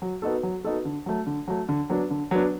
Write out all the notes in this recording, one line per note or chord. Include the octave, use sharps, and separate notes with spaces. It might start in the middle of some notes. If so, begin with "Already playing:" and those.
F#3
B3 D#4 F#4 A4
F#3
B3 D#4 F#4 A4
D3
F#3 A3
D3
F#3 A3
D3
F#3 B3 D4
D3
F#3 B3 D4